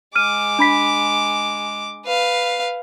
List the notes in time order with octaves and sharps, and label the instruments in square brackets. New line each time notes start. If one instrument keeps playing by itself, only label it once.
[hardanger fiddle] G#3 D6 [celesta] F6 D#7
[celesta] D4 B5 B6
[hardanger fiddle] B4 F5